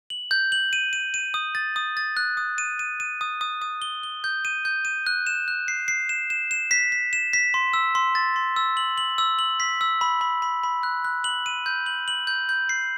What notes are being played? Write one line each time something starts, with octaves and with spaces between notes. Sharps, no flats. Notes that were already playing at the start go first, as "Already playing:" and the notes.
F#7
G6
F#7
D#7
D#7
D#7
D#6
A6
D#6
A6
F#6
D#6
D#7
D#7
D#7
D#6
D#6
D#6
G7
G7
G6
D#7
G6
D#7
F#6
E7
F#6
C7
C7
E7
E7
E7
B6
B6
E7
B6
C6
E6
C6
A6
C6
E6
F#7
F#7
E6
F#7
B6
E6
B5
B5
B5
B5
F#6
F#6
F#7
D#7
G6
F#7
F#7
G6
G6
C7